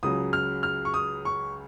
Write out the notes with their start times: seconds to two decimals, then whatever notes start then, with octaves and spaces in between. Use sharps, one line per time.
0.03 C#2 C#3 F#3 D#6
0.33 F6
0.63 F6
0.85 C#6
0.94 D#6
1.25 C#6